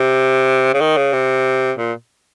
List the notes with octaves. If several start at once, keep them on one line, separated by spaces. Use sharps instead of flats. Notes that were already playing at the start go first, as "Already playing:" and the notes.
Already playing: C3
C#3
D#3
C#3
C3
A#2